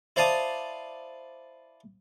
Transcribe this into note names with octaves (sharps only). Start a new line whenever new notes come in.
E4 C5 D5 F5 A5 D#6